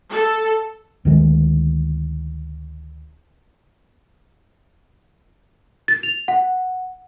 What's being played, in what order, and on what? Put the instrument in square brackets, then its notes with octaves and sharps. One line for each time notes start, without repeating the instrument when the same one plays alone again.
[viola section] A4
[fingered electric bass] D2 D#3 E3 G#3
[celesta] A6
F7
F#5